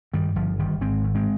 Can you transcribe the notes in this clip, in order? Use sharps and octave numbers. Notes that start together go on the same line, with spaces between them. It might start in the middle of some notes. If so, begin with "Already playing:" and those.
G2 D#3 G3
G1 F3
G1 D#3 G3
G#1 G#3 C4
G#1
G#3 C4